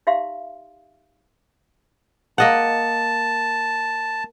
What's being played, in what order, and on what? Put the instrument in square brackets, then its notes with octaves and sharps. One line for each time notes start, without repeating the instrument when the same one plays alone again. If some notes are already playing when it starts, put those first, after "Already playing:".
[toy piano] D#4 G4 E5 F5 C6
[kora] A#3 D#5 F#5 [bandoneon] A5